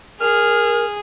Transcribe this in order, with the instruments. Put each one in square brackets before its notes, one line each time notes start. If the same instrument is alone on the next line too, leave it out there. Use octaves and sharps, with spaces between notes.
[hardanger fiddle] G#4 [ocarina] A#4 [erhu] F6